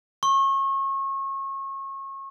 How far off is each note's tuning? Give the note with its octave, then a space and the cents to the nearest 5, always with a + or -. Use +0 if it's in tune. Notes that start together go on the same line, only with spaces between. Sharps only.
C#6 -30